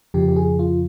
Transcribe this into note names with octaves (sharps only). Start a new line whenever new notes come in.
F2 C#3 F3 G4
G4
G#4
F4